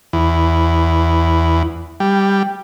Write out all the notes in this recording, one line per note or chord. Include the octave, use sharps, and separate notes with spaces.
E2
G3